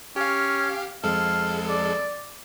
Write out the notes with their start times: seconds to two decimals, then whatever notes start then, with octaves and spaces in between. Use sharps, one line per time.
0.16 C#4 G4 F5
1.04 F2 G#3 A4 F5
1.69 D5